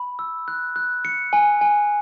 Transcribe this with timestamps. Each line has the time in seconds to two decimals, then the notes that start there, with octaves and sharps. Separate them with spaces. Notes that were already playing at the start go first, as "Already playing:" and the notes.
Already playing: B5
0.19 E6
0.48 F#6
0.76 F#6
1.05 C#7
1.33 G#5
1.61 G#5